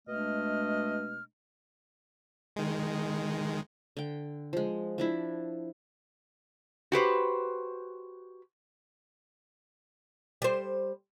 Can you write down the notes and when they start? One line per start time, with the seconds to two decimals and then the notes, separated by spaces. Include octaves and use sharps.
0.08 B2 G#3 A3 D4 D#5 F6
2.56 D#3 G#3
3.97 D3 G5
4.53 F3 G#3
4.98 F3 D4 E4
6.92 F#4 G4 B4 C5
10.42 G3 C5